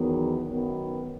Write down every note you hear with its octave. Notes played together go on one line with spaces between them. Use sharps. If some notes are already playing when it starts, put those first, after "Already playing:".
Already playing: E2 D#3 F#3 B3
F#2 D#3 F#3 B3 D#4